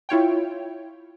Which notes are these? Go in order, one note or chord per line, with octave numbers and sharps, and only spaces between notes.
E4 F4 C#5 G5